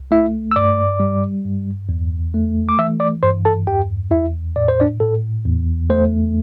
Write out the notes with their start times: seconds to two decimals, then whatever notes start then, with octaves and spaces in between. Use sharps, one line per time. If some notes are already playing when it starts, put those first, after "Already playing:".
Already playing: C2
0.11 A3 E4 E5
0.51 E6
0.56 G2 D5 D6
1.00 G3
1.45 G2
1.89 E2
2.34 A3
2.69 D6
2.78 E3 E5 E6
3.00 D5 D6
3.23 G2 C5 C6
3.45 A4 A5
3.67 E2 G4 G5
4.11 E2 E4 E5
4.56 A2 D5
4.68 C5
4.80 D4 D5
5.00 A2 A4
5.45 E2
5.90 A3 C5